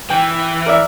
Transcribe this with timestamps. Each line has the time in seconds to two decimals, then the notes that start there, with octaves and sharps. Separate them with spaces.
0.10 E3 G5
0.66 A#4 D5 E5